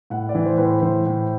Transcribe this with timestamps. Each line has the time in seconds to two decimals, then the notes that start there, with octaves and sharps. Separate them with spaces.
0.10 A2 F#5
0.29 D5
0.35 E3
0.46 C5
0.57 A2 B4
0.65 C5
0.82 E3 C5
1.06 A2